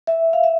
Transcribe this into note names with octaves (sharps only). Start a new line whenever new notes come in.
E5
F5
E5